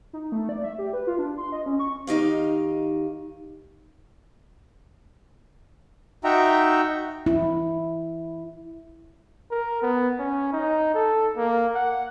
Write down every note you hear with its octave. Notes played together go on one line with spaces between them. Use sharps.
D#4
A3
D5
E5
G4
B4
F4
D4
C6
D#5
C#4
C#6
D#3 D#4 G4 F5
D#4 F#4 E5 G5 A#5
E4
A#4
B3
C#4
D#4
A4
A#3
F#5